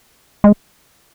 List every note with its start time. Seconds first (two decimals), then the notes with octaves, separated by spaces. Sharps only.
0.44 G#3